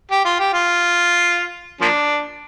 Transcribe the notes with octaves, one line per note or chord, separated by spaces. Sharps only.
G4
F4
G4
F4
F3 A#3 D4